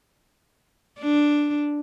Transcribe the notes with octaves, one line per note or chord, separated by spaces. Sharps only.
D4